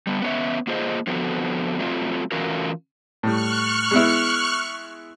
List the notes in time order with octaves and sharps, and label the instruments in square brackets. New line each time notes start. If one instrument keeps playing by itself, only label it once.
[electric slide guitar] G3 B3
B3 C#4 D4 F#4 C#5 E5
A#3 F4 G#4 C5 D#5
D3 F3 B3 C4 F#4 A4
F#3 A3 C4 F4
E3 A3 C#4 F4 F#4 A#4
[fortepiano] A2 G3 [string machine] C#6 F6 F#6
[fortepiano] G#3 B3 E4